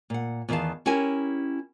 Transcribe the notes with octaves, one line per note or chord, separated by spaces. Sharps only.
A#2 F#5
E2 D#3 E3 E5 F5 A5
C#4 E4 G4 A#4 G5 G#5